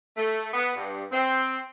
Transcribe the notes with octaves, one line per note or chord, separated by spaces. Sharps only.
A3
B3
G2
C4